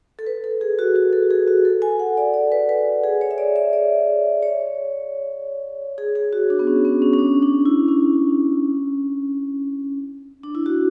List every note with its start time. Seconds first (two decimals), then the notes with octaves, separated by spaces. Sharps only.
0.19 A4
0.26 B4
0.44 A4
0.61 G#4
0.79 F#4
0.96 F#4
1.13 A4
1.31 G#4
1.48 F#4
1.65 A4
1.82 G#5
2.00 F#5
2.17 D5
2.34 D5
2.52 B4
2.69 B4
3.04 G#4
3.21 C#5
3.31 E5
3.38 D5
3.56 E5
3.73 D5
4.42 C#5
5.98 G#4
6.15 G#4
6.33 F#4
6.50 D4
6.59 B3
6.67 C#4
6.85 B3
7.02 C#4
7.13 C#4
7.19 D4
7.42 D4
7.66 E4
7.88 C#4
10.43 D4
10.55 E4
10.66 F#4